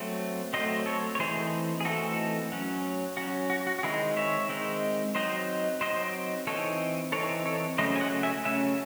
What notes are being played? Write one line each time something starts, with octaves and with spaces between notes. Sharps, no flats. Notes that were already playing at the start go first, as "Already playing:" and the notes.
Already playing: F#3 A3 C4
F#3 A3 C4 C5 D#5
A4 C#5
C#5
E3 A3 C4 D#4 G#4 C5
G#4
E3 A3 C4 D#4 F#4 A4
F#3 C#4
F#3 C#4 F#4
F#4
F#4
F#4
D#3 G#3 C4 D#4 E4 G#4
C#5 E5
D#3 G#3 C4 D#4
F#3 C4 D#4 C5 D#5
F#3 C4 D#4 C5 D#5
E3 C4 D#4 A4 C#5
E3 C4 D#4 A4 C#5
A4 C#5
C#3 F#3 A3 C#4 C5 D#5
G#5
D#5 F#5
E5 G#5
C#3 F#3 A3 C#4 E5 G#5